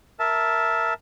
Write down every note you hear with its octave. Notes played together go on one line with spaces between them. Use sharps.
A#4 E5 A5